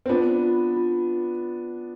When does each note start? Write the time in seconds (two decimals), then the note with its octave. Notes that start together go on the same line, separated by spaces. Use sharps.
0.06 C4
0.09 B3 D4 F4
0.43 F4
0.76 F4